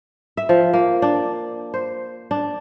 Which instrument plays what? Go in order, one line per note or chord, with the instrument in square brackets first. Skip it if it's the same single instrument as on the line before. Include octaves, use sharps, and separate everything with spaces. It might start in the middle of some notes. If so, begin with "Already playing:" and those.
[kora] E5
F3
A#3
D4
C5
D4